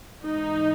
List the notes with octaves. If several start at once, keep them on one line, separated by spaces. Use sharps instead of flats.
G#2 E3 D#4